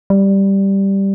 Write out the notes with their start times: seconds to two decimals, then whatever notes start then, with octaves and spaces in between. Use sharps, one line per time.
0.10 G3